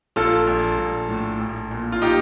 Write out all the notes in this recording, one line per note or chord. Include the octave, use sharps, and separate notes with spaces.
A#1 F4 A4
A#1
A#1
A2
A#1
A#2
F4
D#4 G4